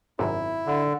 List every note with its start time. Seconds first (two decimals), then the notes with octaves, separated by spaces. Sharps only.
0.19 G#1 F#2 C3 E4
0.67 D3